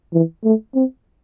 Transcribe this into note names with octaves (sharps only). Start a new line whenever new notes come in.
E3
A3
C4